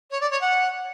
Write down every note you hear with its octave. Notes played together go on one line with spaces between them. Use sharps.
C#5
D5
C#5
F#5